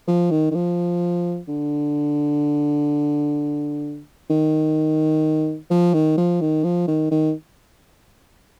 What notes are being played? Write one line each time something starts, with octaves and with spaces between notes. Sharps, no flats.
F3
D#3
D#3
F3
D3
D#3
F3
D#3
F3
D#3
F3
D#3
D#3